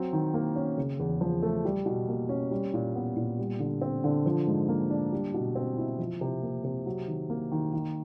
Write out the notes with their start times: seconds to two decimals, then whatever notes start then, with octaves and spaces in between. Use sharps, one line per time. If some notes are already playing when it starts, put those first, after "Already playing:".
Already playing: F#3 C4
0.13 D#3
0.34 A#3
0.56 C#4
0.78 C#3
0.99 E2
1.21 F3
1.42 A3
1.65 G3
1.86 B2
2.08 A#3
2.29 C#4
2.51 G3
2.74 A#2
2.96 B3
3.16 A#2
3.39 G3
3.60 D3
3.82 C4
4.04 D3
4.26 F3
4.47 G#2
4.69 A#3
4.90 D4
5.13 G3
5.34 B2
5.56 C4
5.77 E4
5.99 F3
6.21 C3
6.43 A#3
6.64 C3
6.86 F#3
7.08 D#3
7.30 A#3
7.52 D#3
7.73 D#3